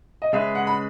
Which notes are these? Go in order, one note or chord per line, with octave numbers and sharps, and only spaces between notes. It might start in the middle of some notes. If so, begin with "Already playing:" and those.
D#5
C#3 G#3 C#4 G#4 B4 E5
F#5
B5